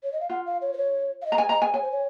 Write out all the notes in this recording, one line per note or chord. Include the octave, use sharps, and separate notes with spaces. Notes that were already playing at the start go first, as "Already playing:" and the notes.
C#5
D#5
F5
F4 F#5
F5
C#5
C5
C#5
F5
D#5
A#5
G#5
D#5 A#5
G#5
C#5 G#5
C5
C#5